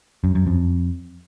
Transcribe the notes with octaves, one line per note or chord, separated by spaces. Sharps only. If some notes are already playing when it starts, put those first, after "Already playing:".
F#2
F#2
F2